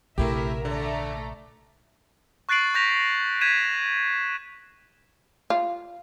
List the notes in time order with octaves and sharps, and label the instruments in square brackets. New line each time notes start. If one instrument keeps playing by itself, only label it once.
[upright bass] A#1 C3 [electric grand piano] A3 E4 G4 [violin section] A#4 E5
[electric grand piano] D3 [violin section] A3 D5 A#5
[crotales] C#6 F#6 A6 C7 D7 F#7
C#6 G6 A#6 B6 F7
G6 G#6 B6 D#7 E7
[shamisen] F4